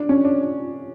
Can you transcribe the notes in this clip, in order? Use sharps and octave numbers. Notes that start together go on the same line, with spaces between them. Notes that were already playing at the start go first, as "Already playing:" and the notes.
Already playing: D4
C#4
D4